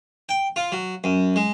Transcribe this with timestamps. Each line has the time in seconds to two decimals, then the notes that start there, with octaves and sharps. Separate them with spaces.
0.29 G5
0.56 F4
0.72 F#3
1.04 F#2
1.36 G#3